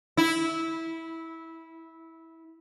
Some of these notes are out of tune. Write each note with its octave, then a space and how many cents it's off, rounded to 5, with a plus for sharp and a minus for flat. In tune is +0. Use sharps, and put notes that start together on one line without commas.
E4 -15